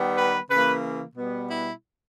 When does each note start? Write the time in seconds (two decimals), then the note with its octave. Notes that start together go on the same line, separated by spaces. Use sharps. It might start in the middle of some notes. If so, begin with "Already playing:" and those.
Already playing: D#3 G3 B3
0.17 B4
0.50 C#3 E3 A#3 B4
1.16 B2 G3 B3
1.49 E4